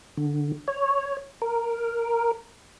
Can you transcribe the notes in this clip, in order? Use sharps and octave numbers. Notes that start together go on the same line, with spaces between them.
D3
C#5
A#4